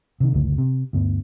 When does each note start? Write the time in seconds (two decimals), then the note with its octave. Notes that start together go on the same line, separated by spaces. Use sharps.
0.20 C3 D#3
0.33 F#1 C#2 D3 A3
0.58 C3
0.93 D2 G2 B3